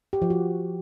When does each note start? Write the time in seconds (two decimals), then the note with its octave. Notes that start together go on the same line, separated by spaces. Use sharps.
0.13 G4
0.22 F3
0.30 F#4